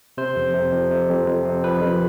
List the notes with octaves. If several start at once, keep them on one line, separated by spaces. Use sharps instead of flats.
C3 C5
F2
C3
F2
C3
F2
F2
C3
F2 B4
F2